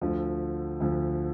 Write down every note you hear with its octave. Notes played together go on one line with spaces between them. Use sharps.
D2 D3 F3
D2 D3 F3